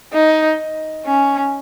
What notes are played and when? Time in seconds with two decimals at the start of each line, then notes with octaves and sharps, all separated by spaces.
0.13 D#4
1.06 C#4